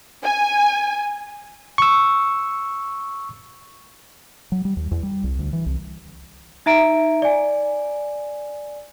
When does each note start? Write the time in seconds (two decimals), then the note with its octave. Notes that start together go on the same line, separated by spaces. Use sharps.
0.23 G#5
1.78 C#6 E6
4.52 F#3
4.65 G3
4.77 D#2
4.91 E2
5.03 G3
5.24 C2
5.39 D2
5.53 E3
5.66 C2
6.66 D#4 E5 A#5 D7
7.22 D5 G#5